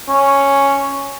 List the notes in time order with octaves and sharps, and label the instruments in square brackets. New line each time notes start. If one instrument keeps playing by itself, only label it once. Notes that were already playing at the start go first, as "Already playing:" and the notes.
[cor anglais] C#4